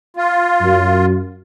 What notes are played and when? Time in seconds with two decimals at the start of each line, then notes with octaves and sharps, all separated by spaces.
0.17 F4
0.62 F#2